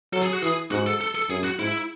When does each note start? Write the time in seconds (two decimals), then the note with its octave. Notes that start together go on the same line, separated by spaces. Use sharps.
0.13 F#3 A4
0.22 G#4
0.33 F#4
0.42 E3 G#4
0.71 G#2 F#4
0.86 A4
1.01 A4
1.15 A4
1.30 F#2 G#4
1.44 F#4
1.59 G#2 E4